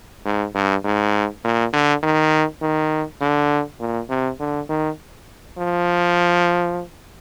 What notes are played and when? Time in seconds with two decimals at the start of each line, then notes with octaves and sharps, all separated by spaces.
0.25 G#2
0.55 G2
0.85 G#2
1.44 A#2
1.73 D3
2.03 D#3
2.62 D#3
3.21 D3
3.80 A#2
4.09 C3
4.40 D3
4.69 D#3
5.58 F3